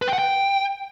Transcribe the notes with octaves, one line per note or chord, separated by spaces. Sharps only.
B4
G5
F#5
G5